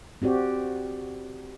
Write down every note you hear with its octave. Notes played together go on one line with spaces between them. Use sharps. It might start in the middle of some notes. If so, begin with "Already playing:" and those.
C4 F#4 G4 D5